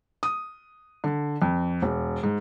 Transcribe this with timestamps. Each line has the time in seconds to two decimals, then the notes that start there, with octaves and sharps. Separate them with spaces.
0.23 D#6
1.04 D3
1.42 F2
1.82 E1
2.23 G#2